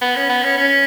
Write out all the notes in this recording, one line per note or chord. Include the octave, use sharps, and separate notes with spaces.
B3
C#4
B3
C#4
C#4